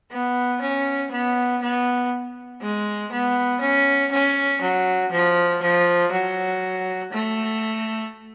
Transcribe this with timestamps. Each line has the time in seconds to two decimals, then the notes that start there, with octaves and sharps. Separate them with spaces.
0.11 B3
0.62 C#4
1.12 B3
1.62 B3
2.62 G#3
3.12 B3
3.61 C#4
4.12 C#4
4.62 F#3
5.12 F3
5.62 F3
6.12 F#3
7.12 A3